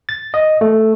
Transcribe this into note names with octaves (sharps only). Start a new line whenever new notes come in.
A6
D#5
A3